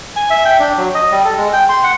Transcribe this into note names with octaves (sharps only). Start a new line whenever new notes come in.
G#5
E5
G5
D4
F#3
D#5
G3
A4
G#3
G5
C6
F#5